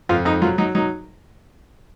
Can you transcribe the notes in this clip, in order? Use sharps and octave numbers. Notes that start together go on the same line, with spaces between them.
F2 F4
F2 D#4
F#3 F4
F#3 D#4
F#3 D#4